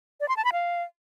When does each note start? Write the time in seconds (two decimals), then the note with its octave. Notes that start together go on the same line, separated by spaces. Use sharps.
0.21 D5
0.29 C6
0.37 A5
0.45 B5
0.53 F5